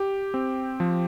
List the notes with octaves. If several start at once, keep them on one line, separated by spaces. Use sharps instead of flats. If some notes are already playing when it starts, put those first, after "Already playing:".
Already playing: G4
C4
F3